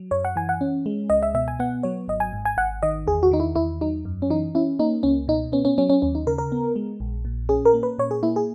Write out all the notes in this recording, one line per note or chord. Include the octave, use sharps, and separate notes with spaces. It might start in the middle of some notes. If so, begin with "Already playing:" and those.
Already playing: F#3
F#2 C#5
F#5
E3 G#5
F#5
C#4
G#3
C#2 D#5
E5
B2 E5
G#5
B3 F#5
F#3 C#5
G#1 D#5
G#5
G#2
G#5
G#1 F#5
D#3 D#5
E2 G#4
F#4
D#3 D#4
E4
E2 E4
F#3 D#4
F#2
C#4
E3 D#4
C#4 E4
A#3 D#4
C#2 C#4
B2 D#4
B3 C#4
C#4
F#3 C#4
C#4
D#2 C#4
D#4
C#3 A#4
A#4
B3
G#3
A#1
A#2
C#4 G#4
A#4
A#3
B4
A#2 C#5
G#4
A#3 E4
G#4